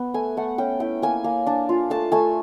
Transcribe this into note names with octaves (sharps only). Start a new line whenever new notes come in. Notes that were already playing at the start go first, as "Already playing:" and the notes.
Already playing: B3
A3 G#5
A3 F#5
C#4 G5
E4 G5
A#3 G#5
A#3
D4
F4
A3 A5
A3 G#5